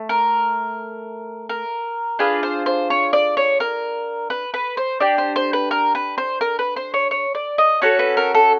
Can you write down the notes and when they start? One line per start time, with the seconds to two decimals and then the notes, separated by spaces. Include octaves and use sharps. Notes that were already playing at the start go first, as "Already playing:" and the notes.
Already playing: A3
0.09 A#4
1.49 A#4
2.19 D4 F4 G#4 B4
2.43 C5
2.66 C5
2.90 C#5
3.13 D5
3.37 C#5
3.60 A#4
4.30 B4
4.54 B4
4.77 C5
5.00 D4 G4 D5
5.18 C5
5.36 C5
5.53 B4
5.71 A#4
5.95 B4
6.18 C5
6.41 A#4
6.59 B4
6.76 C5
6.94 C#5
7.11 C#5
7.35 D5
7.58 D#5
7.82 C#4 F#4 A4 C#5
7.99 B4
8.17 A#4
8.35 A4